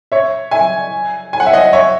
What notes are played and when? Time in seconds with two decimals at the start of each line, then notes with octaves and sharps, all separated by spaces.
0.12 C#5 E5
0.51 E5 G#5
1.33 G#5
1.40 F#5
1.46 E5
1.53 D#5 F#5
1.73 C#5 E5